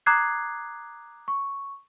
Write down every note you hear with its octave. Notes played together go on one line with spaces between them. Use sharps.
A#5 D6 D#6 F#6 G#6 C7
C#6